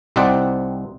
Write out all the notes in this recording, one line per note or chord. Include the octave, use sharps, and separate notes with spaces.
C2 C3 C4 D#4 D5 F#5